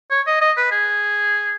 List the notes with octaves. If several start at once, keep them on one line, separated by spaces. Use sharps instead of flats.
C#5
D#5
D#5
B4
G#4